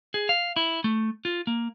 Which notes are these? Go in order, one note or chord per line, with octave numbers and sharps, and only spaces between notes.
G#4
F5
E4
A3
F4
A#3